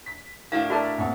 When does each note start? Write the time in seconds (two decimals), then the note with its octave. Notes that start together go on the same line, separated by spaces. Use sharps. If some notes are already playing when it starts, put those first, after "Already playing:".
0.06 B6
0.52 A2 D4 E4 F#4 A#4 F5
0.70 F#4 A#4 D5 E5 A5 A#5
0.98 A1 A#3 C4 F#5 A6